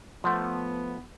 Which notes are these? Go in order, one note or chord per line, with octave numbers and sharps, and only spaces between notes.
F3 A3 B3 F#5 C6